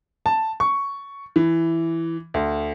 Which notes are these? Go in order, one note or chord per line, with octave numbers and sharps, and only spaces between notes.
A5
C#6
E3
D2